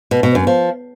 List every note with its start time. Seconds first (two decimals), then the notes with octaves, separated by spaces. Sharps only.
0.11 B2
0.23 B2
0.35 F#2
0.47 F3